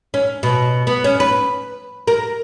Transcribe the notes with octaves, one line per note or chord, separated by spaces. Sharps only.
C#4
B2
B3
C#4
B4
A#4